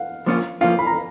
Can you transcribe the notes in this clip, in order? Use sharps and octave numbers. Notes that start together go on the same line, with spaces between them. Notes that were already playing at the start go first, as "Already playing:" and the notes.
Already playing: F5 F#5
F3 A#3 C#4 F4
F3 A#3 C#4 F4 F5
B5
A#5